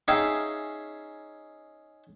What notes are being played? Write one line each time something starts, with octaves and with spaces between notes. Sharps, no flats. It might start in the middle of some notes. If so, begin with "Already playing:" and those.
C#4 D#4 G#4 E5 F5 G5